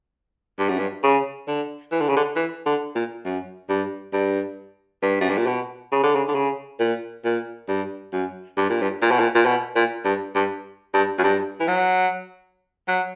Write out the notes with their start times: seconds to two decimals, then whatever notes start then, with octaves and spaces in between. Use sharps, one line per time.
0.59 G2
0.69 F#2
0.79 G2
1.04 C#3
1.48 D3
1.92 E3
2.01 D3
2.09 C#3
2.16 D3
2.36 E3
2.66 D3
2.95 A#2
3.25 F#2
3.70 G2
4.13 G2
5.03 G2
5.21 F#2
5.29 G2
5.38 A#2
5.46 B2
5.92 C#3
6.03 D3
6.15 C#3
6.28 D3
6.35 C#3
6.80 A#2
7.25 A#2
7.68 G2
8.13 F#2
8.57 G2
8.70 A#2
8.82 G2
9.02 A#2
9.11 B2
9.19 A#2
9.35 A#2
9.46 B2
9.75 A#2
10.05 G2
10.35 G2
10.94 G2
11.18 F#2
11.24 G2
11.60 E3
11.68 F#3
12.88 F#3